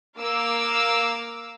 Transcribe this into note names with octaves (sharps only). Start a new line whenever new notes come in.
A#3 F5 D6 E6